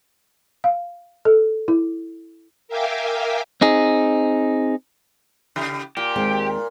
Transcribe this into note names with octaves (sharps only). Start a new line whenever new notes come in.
F5
A4
E4
A#4 E5 F5 G5 G#5 D6
C4 D#4 G#4
C#3 G4
A#2 G4
D#2 G#3 C4